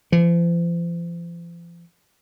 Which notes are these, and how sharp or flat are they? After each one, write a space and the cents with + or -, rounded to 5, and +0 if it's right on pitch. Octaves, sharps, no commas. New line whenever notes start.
F3 -40